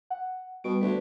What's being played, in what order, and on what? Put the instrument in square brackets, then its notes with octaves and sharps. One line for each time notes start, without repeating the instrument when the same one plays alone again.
[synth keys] F#5
[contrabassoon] B2 [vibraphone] G3 B3 [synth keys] D7
[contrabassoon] D2 [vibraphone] F#4 B4